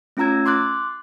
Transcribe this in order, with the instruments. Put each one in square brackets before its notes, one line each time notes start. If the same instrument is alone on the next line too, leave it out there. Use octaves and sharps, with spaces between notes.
[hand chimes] A3 C#4 F4 A#5 E6 G#6
C6 D6 F#6 A6